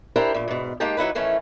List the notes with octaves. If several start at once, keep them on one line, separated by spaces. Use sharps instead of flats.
D4 E4 G4 A#4 C5
E2 A#2
G#2 B2
G#3 A#3 D#4 G4 G5 A5
F#3 D#4 E4 B4
D#3 E3 A3 C#4